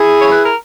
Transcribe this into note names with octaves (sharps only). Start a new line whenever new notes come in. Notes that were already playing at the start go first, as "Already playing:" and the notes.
Already playing: E4 G#4
C#3 F#3 C#5
B4
A#4